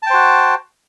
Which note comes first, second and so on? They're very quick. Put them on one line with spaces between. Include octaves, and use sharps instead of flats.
A5 G5 C5 F#4